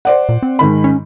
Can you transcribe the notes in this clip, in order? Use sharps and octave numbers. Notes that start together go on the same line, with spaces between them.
C5 D5 F#5
A#2
C4
G#2 D#3 B5
C#4